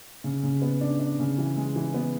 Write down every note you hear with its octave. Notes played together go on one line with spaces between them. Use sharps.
C#3
C#3
B3
D4
D4
C#3
E3
G#3
E3
B3